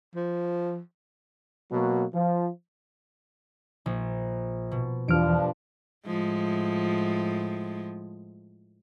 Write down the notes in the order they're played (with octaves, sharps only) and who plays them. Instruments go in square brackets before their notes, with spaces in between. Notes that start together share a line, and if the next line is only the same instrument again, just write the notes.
[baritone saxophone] F3
[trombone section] B2 F#3 A#3 F#4
F3
[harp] A#1
B2
[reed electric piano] E2 E3 F6 [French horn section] G2 F3 D4 [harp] D7
[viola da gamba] A2 F3 G#3